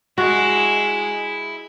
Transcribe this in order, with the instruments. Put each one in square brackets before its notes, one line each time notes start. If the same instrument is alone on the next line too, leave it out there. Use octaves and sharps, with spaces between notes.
[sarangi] G#3 [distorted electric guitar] E4 [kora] F#4